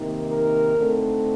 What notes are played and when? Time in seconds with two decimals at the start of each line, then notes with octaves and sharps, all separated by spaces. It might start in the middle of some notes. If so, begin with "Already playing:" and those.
Already playing: C3 D#3 A#3 D#4
0.29 A#4
0.75 D3 A3 C4 D#4